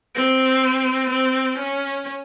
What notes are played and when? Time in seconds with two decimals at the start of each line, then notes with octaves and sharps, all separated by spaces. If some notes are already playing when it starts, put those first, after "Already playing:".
0.16 C4
1.10 C4
1.58 C#4